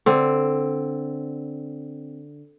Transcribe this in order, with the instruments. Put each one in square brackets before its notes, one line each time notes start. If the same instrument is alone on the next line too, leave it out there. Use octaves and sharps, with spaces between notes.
[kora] D3 C4